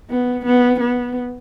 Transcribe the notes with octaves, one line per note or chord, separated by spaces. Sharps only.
B3
B3
B3